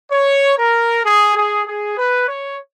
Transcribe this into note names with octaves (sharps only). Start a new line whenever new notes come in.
C#5
A#4
G#4
G#4
G#4
B4
C#5